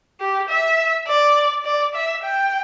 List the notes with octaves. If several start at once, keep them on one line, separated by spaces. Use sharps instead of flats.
G4
E5
D5
D5
E5
G5